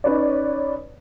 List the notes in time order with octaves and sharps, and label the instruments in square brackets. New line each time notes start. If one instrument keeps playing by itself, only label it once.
[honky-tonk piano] C#4 D#4 B4 C#5 D5